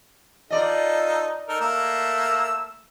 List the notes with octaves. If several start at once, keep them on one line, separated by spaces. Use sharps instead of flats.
D#4 F4 A4 D5 D#5
D#4 A4 A#4
A3 A#3 E6